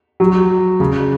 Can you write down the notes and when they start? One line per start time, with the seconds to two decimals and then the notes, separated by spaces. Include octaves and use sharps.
0.20 F#3
0.80 C#3